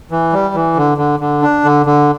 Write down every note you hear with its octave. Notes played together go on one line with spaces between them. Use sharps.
E3
G3
E3
D3
D3
D3
D4
D3
D3